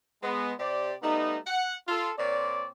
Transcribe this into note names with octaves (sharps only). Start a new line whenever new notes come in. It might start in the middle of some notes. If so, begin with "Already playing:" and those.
G#3 B3
C3 G4 C5 D5
G3 A3 B3 D#4
F#5
F4 A4
A#2 C4 C#5 D5